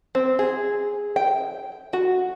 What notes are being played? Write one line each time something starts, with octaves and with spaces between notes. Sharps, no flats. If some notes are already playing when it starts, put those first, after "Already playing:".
C4
G#4
G5
F#4